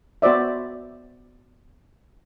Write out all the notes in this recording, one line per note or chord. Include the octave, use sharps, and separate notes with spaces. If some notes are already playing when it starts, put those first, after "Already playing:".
B3 F#4 C5 D5 E5